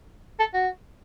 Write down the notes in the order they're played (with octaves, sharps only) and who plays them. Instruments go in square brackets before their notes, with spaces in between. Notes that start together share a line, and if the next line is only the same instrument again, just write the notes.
[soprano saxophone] A4
F#4